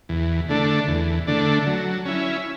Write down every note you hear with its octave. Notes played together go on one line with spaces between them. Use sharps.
E2
D3 A3 D4
E2
D3 A3 D4
F#3
C#4 E4